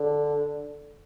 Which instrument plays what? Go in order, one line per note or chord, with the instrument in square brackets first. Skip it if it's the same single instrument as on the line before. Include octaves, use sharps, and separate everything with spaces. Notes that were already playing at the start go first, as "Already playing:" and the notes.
Already playing: [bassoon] D3